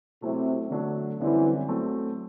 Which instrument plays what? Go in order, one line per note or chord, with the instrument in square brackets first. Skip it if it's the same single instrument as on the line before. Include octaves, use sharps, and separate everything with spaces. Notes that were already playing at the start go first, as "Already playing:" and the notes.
[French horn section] C3 [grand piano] F#3 A3 E4
[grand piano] D3 F#3 A3 D4
[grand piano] F#2 D3 G3 C4 [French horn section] E3
[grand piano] F#3 A3 C4